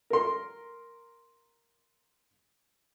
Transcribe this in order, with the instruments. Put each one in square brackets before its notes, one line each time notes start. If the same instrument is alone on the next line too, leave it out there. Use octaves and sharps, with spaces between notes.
[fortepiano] A#4 C6